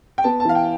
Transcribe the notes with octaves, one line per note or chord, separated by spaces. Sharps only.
G5
B3 A5
A5
E3 F5
G5